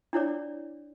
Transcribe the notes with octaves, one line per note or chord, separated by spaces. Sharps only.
D4 E4 C#5 D5